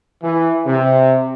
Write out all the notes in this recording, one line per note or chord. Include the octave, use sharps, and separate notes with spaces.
E3
C3